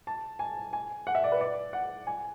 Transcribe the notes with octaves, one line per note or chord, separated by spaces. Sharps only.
A5
G#5
G#5
F#5
E5
D5
B4
D5
F#5
G#5